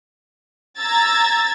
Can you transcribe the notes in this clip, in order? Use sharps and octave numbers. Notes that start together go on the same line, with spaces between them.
A#5 E6 G#6 A6